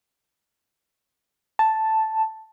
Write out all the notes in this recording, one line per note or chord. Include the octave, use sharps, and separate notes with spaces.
A5